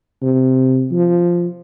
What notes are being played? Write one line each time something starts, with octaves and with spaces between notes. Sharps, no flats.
C3
F3